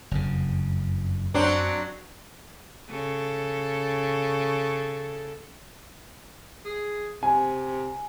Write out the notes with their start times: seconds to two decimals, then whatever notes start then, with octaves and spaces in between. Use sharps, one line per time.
0.11 F#1 F2 C#3
1.34 F#2 F#3 C4 D4
2.89 C#3 A4
6.65 G#4
7.23 C3 G#5